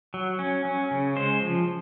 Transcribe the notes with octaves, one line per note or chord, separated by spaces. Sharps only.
F#3
C#4
C#4
C#3
G#3 C5
F3